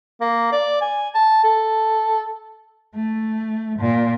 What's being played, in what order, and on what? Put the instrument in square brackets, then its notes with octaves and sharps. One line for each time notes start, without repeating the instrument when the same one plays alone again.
[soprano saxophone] A#3
D5
G#5
A5
A4
[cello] A3
A#2